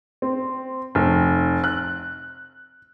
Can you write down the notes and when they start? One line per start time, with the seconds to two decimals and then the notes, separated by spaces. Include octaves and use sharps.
0.22 C4
0.95 F1
1.64 F#6